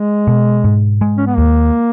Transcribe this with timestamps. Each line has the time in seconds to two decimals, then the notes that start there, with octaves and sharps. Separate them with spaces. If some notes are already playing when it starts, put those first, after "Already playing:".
Already playing: G#3
0.27 B2
0.64 G#2
1.01 G#3
1.17 C#4
1.26 B3
1.37 D#2 A#3